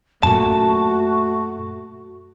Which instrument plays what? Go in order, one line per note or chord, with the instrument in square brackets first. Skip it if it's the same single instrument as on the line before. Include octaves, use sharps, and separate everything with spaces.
[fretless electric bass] F#2 A#2 [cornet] A3 [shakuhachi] F#4 [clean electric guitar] A5